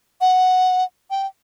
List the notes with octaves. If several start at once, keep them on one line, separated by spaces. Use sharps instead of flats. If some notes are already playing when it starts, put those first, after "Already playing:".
F#5
G5